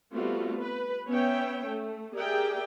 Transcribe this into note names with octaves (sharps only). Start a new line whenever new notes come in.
G3 A3 B3 C4 F4 F#4
B4
B3 C#4 C#5 E5 G5
A3
G4 G#4 A#4 D5 E5 G5